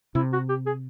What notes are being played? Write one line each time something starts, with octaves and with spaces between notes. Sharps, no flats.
C3 E4
F#4
G4
G#4